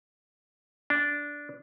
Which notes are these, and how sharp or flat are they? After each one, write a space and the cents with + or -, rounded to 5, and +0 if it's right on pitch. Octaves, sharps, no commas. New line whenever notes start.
D4 -10